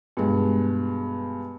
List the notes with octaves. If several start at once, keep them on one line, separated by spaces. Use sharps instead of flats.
G2 B2 G#3